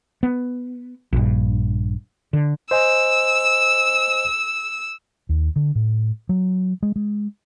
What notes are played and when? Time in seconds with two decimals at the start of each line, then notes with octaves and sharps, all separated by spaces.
0.23 B3
1.13 A#1 G2
2.33 D3
2.71 C5 D#5 G#5 E6
5.29 D#2
5.56 D3
5.75 A2
6.29 F#3
6.83 G#3
6.96 G#3